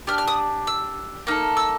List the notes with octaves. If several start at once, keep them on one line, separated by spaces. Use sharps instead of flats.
D4 G4 F6
F6
D#6
E6
A#3 D#4 A4 F6
E6